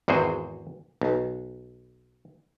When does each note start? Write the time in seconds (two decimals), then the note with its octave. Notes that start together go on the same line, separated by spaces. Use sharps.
0.08 G#1 E2 F#4 G#4 C5
1.01 B1